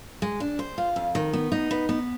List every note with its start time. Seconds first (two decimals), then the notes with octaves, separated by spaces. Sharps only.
0.22 G#3
0.40 D4
0.59 C5
0.78 F4
0.96 F2
1.15 D#3
1.33 B3
1.52 D#4
1.71 B3
1.89 B3